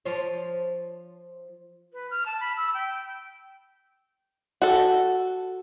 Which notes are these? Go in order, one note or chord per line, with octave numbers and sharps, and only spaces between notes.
F3 C5 C#5
B4
F6
A5
B5
E6
G5
F#4 A4